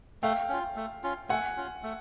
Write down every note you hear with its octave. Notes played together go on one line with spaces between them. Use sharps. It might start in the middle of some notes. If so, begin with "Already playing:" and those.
A3 F5 G5
C#4 F4
A3
C#4 F4
A3 F#5 G#5
C#4 F4
A3